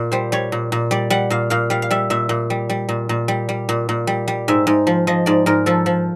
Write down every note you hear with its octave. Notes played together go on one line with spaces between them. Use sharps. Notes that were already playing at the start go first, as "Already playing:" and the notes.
Already playing: A#2
G3 C5
G3 C#5
A#2
A#2
G3 D5
G3 F#5
A#2 F5
A#2 F5
G3 F5
F5
G3 E5
A#2 E5
A#2
G3
G3
A#2
A#2
G3
G3
A#2
A#2
G3
G3
G#2 E5
G#2
F3
F3 D#5
G#2 D5
G#2 A#4
F3 A4
F3